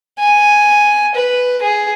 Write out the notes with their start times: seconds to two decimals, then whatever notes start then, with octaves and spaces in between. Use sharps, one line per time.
0.19 G#5
1.15 B4
1.62 G#4